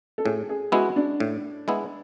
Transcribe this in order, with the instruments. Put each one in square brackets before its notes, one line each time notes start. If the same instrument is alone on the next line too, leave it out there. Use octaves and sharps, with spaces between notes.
[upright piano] A4
[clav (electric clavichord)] A2 [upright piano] G#4
[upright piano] G#4
[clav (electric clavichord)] G#3 B3 E4 [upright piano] F#4
[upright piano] D4
[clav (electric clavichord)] A2
G#3 B3 E4